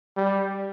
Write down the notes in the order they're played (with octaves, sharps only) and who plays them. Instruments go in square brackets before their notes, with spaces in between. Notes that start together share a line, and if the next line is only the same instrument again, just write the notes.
[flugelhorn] G3